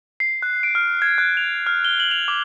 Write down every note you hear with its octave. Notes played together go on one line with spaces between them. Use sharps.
C7
F#6
D7
F6
G#6
F#6
F7
F6
G7
F#7
F7
D6